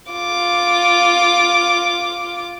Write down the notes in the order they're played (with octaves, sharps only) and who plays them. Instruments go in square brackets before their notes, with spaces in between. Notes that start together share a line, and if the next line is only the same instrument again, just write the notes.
[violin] F4 D6